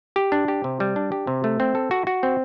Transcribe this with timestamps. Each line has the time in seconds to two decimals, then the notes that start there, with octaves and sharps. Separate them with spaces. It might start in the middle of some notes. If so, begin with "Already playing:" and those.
0.16 G4
0.32 D4
0.48 G4
0.64 C3
0.80 G3
0.96 D4
1.12 G4
1.27 C3
1.44 A3
1.60 C4
1.75 A4
1.91 F#4
2.07 F#4
2.23 C4